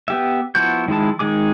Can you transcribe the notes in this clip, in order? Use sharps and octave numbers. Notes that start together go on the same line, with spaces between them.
B3 G4 E5
F3 B3 E4 F#4 G6
D#3 F3 G#3 E4 A5
D#3 G#3 G#4 D6